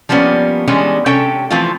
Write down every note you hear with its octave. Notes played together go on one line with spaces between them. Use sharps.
F3 G3 A#3 B3 C#4
E3 G3 G#3 B3 C#4 D4
C3 C#4 A4 C#5 G5
E3 F3 A3 C4 F4